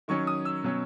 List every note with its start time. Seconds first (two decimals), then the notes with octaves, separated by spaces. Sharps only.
0.08 D#3 F#3 C#4 C#6
0.27 D#6
0.45 E6
0.64 B2 F#3 C#4